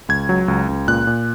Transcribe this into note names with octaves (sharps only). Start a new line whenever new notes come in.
C#2 G#6
F#3
C#2
C#2
A#2 F#6
A#2